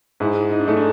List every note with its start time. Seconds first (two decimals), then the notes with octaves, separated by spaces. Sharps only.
0.20 G#2 E4
0.51 D#4
0.60 D4
0.66 A3 D#4
0.77 D4